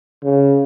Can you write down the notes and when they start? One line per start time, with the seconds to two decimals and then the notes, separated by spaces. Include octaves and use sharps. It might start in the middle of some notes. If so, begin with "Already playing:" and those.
0.24 C#3